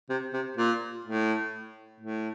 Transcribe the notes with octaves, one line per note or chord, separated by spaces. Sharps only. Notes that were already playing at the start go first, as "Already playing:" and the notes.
C3
C3
A#2
A2
A2